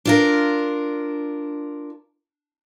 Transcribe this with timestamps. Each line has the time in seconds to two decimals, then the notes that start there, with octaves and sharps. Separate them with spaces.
0.05 D4 F4 A#4